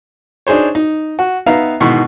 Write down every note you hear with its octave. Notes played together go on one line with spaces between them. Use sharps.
D4 D#4 G#4 C5 C#5
D#4
F#4
B3 D#4 E5 F5 A#5
G#2 B2 D#3 E3 C#6